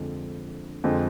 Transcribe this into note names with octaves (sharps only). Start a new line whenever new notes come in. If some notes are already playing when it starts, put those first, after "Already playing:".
Already playing: F2 D3 G#3 C4
F2 D3 G#3 C4